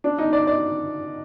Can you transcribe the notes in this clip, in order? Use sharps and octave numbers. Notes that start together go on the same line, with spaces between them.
D4
D#4
D5
D5